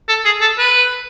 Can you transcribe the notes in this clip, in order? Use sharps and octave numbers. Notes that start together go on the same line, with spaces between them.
A4
G#4
A4
B4